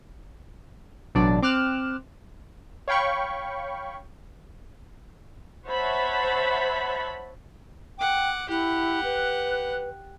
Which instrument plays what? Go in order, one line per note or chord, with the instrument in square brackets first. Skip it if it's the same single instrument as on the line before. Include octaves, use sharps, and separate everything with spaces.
[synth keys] A1 B2 F#3 D4 D5
C4 D6 F6 F#6 E7
C#5 F5 G5 B5 C#6
[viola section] C5 C#5 E5 F#5 A5 B5
[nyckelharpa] F#5 D6 [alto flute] G5
[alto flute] E4 [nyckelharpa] G4 F#5
[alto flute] B4